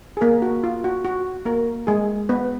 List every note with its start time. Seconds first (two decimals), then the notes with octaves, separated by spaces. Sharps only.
0.17 G#4
0.21 A#3 A#4
0.42 F#4
0.64 F4
0.84 F#4
1.05 F#4
1.45 A#3 A#4
1.87 G#3 G#4
2.29 B3 B4